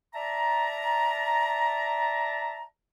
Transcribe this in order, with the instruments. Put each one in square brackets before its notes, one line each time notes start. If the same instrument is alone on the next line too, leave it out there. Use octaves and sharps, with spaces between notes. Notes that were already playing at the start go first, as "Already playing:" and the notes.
[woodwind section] D5 E5 A5 A#5